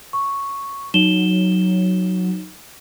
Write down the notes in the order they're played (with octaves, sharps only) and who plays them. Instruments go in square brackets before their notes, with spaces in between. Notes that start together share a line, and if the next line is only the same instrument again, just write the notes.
[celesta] C#6
[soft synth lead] F#3 [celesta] D#4 E7 G7